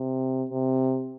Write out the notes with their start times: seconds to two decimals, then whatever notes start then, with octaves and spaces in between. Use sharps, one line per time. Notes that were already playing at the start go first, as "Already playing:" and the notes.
Already playing: C3
0.49 C3